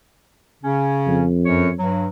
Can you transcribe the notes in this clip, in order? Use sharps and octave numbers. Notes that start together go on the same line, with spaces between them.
C#3 C#4
F2
F#2 C#5
G2 F#3